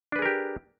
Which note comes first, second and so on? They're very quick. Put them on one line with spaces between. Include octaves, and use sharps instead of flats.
D4 B4 G#4 A#4 G4